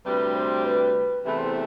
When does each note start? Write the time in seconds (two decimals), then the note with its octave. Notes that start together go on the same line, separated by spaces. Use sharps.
0.05 D2 C3 G3 B4
0.35 C5
0.64 B4
1.25 E2 C3 E3 A3 B4
1.38 C5